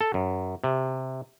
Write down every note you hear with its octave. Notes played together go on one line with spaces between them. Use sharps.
A4
F#2
C3